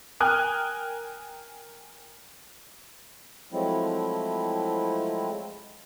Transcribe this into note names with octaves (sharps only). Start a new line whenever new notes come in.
A#4 G5 G#5 D#6 F6 F#6
F3 F#3 G#3 A3 C4 E4